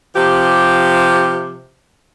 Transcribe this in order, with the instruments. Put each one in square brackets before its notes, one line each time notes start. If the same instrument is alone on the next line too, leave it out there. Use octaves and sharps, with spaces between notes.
[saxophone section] C3 F3 G4